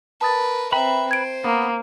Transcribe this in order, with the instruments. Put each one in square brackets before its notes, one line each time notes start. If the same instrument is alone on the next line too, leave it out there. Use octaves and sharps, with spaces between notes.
[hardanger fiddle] A#4 B4 [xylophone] A5 D#6 A6
[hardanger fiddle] C4 E5 [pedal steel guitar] B4 B5 [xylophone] G5 A#5
[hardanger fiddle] C5 [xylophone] G#6 D7
[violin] A#3 [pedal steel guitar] B3